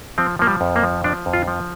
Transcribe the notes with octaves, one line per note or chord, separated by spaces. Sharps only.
F3 C4
F3 A#3
G3
F2
A#3
F3
F3 D4
F2
F4
F3